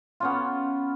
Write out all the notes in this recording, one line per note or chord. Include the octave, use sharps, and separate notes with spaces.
B3 C#4 F4